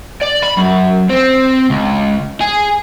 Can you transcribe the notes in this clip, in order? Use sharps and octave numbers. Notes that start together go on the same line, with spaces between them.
D5
B5
F#2
C4
C#2
G#4